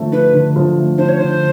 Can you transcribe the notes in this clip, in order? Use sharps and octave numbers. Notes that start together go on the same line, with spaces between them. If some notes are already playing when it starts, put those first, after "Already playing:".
Already playing: D3 F3 A3 D4
D4 B4
D3
F3
A3
D4 C5
C#5
D3 C5